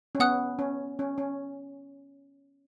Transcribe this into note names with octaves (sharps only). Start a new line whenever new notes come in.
C#4
B3 F#5 D#6 F#6
C#4
C#4
C#4